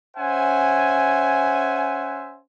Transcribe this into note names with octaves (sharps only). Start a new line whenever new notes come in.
C#4 C5 E5 F#5 G#5